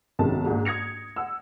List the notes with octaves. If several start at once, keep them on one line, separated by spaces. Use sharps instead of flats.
B1 F#2 C3 D#3 G#3 A5
A#1 G#2
D#6 G#6 A#6 C#7 F7
F#5 E6